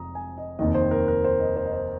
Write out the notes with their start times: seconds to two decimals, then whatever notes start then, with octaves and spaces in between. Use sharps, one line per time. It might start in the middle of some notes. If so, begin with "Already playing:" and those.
Already playing: F1 F2 A#5 D#6
0.15 G#5
0.38 D#5
0.59 F1 D#2 D#3 D#5
0.75 C5
0.91 A#4
1.08 A#4
1.24 C5
1.40 D#5
1.56 C5
1.65 D#5
1.73 C5